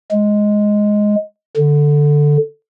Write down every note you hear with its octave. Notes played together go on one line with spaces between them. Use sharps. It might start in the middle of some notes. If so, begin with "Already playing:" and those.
G#3
D3